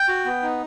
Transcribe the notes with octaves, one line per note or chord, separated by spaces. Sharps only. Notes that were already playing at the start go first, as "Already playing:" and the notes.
Already playing: G5
F#4
B3
D#4